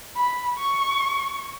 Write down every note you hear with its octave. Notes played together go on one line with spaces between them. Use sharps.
B5
C#6